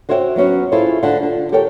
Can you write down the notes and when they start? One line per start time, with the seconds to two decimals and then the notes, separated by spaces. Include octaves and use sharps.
0.09 F#4 C5 C#5 E5 F#5 G5
0.36 F#3 B3 C#4 F#4
0.72 E4 F4 G#4 A4 C5 C#5
1.03 D3 F4 C5 F#5 A5
1.23 D3
1.52 G4 A4 A#4 C#5 G5